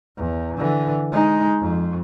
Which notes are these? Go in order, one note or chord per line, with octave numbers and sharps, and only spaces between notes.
E2
D3 E3
G#3 D#4
F2